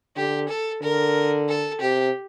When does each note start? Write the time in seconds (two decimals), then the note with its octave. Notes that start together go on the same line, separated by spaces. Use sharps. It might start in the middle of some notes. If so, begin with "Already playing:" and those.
0.16 D3 G4
0.49 A4
0.82 D3 A#4
1.49 A4
1.81 C3 G4